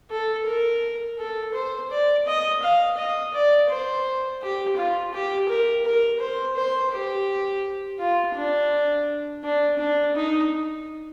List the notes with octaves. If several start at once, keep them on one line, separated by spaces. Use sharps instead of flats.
A4
A#4
A4
C5
D5
D#5
F5
D#5
D5
C5
G4
F4
G4
A#4
A#4
C5
C5
G4
F4
D4
D4
D4
D#4